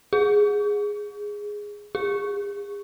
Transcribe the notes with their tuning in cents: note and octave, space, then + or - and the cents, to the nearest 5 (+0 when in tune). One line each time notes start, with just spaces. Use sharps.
G#4 -5
G#4 -40